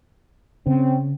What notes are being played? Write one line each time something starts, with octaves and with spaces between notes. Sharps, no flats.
C#3 C4 C#4